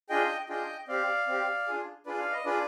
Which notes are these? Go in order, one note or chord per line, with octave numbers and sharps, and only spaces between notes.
D4 F4 G#4 D#5 G5
D4 F4 G#4 D#5 G5
C4 G4 D5 F5
C4 G4
D4 F4 G#4
D4 F4 G#4 B4 D5
F5
D#5
D4 F4 G#4 B4 D5